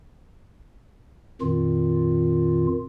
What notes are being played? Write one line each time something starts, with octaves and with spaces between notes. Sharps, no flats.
F2 A#2 D#3 F4